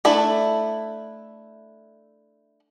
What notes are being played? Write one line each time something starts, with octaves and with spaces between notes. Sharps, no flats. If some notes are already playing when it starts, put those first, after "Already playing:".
A3 D4 E4 A4